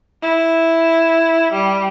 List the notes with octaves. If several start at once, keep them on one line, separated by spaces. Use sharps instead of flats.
E4
G3